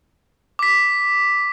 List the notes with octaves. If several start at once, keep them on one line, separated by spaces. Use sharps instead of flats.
D6 B6